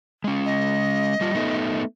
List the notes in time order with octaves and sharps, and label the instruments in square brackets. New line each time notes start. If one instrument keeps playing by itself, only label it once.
[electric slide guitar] G#3 C#4
[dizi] D#5
[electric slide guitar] G3 F4
A3 B3 D#4